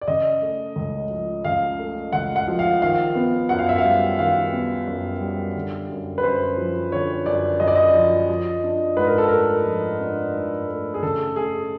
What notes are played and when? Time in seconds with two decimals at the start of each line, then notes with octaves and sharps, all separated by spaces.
0.01 D5
0.08 C#3 D#5
0.42 A3
0.76 C#2
1.10 F3
1.45 C#3 F5
1.79 A3
2.13 C#2 F#5
2.36 F#5
2.48 F3
2.59 F5
2.82 D#3 F5
3.15 B3
3.49 F#2 F#5
3.59 F5
3.69 E5
3.78 F5
3.84 G3
4.18 D#3 F5
4.52 B3
4.87 F#2
5.21 G3
5.55 D3
5.89 F#2
6.18 B4
6.23 F#2 C5
6.57 F3
6.92 D3 C#5
7.26 F#2 D5
7.60 F#2 D#5
7.68 D5
7.75 D#5
7.94 F3
8.29 F3
8.64 D4
8.97 G#2 B4
9.07 A#4
9.18 A4
9.28 A3 A#4
9.66 F3
10.00 D4
10.35 G#2
10.69 A3
10.94 G#4
11.03 C#3 A4
11.36 A3 G#4